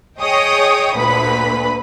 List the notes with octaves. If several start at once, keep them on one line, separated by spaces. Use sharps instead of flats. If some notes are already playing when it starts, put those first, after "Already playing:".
G#4 C#5 D#5 G5 D#6
D2 A#2 B4 B5